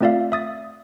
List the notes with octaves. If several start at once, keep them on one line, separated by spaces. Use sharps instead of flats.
A3 C4 F4 D5 E5 F5
E5 D#6 A6